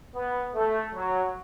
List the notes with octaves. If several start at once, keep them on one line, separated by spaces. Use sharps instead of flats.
B3
A3
F#3